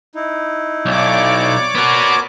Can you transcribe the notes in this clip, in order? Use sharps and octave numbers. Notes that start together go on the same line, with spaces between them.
D#4 E4
B1 C#5 D5 D6
B3 F#4 A#4